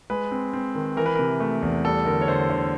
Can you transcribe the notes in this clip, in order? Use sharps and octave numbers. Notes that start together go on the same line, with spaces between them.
G#3 B4
C4
C4
D#3
E3 A#4
B4
C3 A#4
A3
E2
G3 A4
D3 A#4
C#5
D3 C5
D3